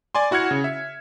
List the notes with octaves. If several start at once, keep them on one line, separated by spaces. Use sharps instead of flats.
D5 G#5 C6
E4 F#4 F#5 F6 G#6 C#7
C#3
E5